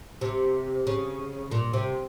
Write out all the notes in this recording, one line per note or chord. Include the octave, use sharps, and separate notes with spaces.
C3
C#3
A#2
C3